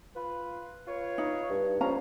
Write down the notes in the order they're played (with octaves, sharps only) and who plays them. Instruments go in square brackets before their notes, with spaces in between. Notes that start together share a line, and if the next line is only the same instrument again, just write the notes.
[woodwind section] F4 B4
F4 B4 C#5
[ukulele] D#4
[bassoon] G2
[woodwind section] G2 [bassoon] F3 [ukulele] C#4 F5 A#5